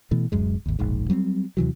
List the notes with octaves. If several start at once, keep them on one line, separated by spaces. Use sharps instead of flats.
B2 E3 A3
D1 F#2 G#3
G#1 D#2
E1 A#1 G#2
F#3 G3 B3 C4
D#2 C3 E3 F#3